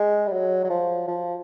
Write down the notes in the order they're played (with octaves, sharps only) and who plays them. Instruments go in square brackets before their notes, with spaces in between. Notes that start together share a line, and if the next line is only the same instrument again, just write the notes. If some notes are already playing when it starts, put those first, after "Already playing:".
Already playing: [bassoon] G#3
G3
F#3
F#3
F3
F3